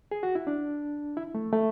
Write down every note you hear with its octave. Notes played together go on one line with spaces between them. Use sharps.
G#4
F#4
E4
D4
E4
A3
A3